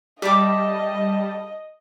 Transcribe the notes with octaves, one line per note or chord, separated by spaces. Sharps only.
G3 D#5 E5 A5 D6